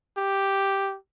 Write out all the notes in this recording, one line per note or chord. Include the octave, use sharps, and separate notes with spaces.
G4